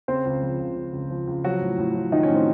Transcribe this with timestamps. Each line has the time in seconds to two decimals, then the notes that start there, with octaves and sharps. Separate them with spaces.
0.08 C#3 C4 C5
0.25 C#2
0.43 F3
0.59 C#2
0.76 C#3
0.93 C#2
1.10 F3
1.27 C#2
1.44 F3 F#3 F#4
1.61 A2
1.78 A2
1.95 F3
2.12 D#3 F3 D#4
2.23 C#4
2.29 A2
2.35 C4